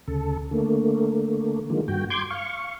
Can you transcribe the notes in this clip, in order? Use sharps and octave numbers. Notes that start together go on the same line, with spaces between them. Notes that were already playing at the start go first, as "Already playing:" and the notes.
D2 C#3 A4
D3 A3 A#3
D3 D#3 F3 G#3 A#3
G2 F#4 G5
C6 D6 G6 G#6
F5 C#6